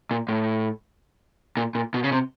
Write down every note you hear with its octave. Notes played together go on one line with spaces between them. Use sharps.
A#2
A2
A#2
A#2
B2
C#3
C3